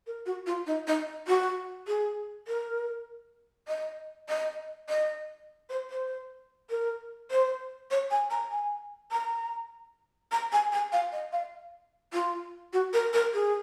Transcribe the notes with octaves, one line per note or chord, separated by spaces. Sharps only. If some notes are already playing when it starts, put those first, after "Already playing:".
A#4
F#4
F4
D#4
D#4
F#4
G#4
A#4
D#5
D#5
D#5
C5
C5
A#4
C5
C#5
G#5
A#5
G#5
A#5
A#5
G#5
G#5
F5
D#5
F5
F4
F#4
A#4
A#4
G#4